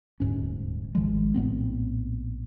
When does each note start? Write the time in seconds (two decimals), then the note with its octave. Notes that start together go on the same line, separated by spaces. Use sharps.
0.20 D#1 D2 G#2 C#4
0.95 G#1 D#3 F3 G#3
1.34 A#1 A2 B3 C4